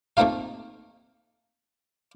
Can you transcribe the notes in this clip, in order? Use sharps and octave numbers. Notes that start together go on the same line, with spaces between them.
A3 A#3 C4 D#4 F4 F5